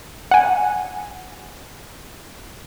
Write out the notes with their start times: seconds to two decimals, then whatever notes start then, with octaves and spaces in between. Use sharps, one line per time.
0.31 F#5 G#5